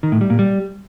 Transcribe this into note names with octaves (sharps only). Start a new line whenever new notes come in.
D#3
A2
G3
A#2
G3